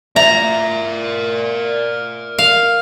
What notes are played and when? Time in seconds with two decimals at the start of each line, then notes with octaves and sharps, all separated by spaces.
0.16 A#4 D5 E5 A#5
2.39 F5